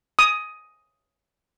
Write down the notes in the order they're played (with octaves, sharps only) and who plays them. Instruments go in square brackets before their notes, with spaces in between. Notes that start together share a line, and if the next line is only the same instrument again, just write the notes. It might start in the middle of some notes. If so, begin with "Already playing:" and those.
[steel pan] D#6